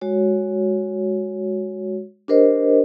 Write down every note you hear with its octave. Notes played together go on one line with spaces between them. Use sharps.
G#3 F#4 C#5
D4 G4 A#4 C5 D#5